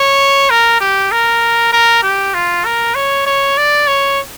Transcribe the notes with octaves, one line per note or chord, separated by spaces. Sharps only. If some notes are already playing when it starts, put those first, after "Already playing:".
Already playing: C#5
A#4
G4
A#4
A#4
G4
F4
A#4
C#5
C#5
D5
C#5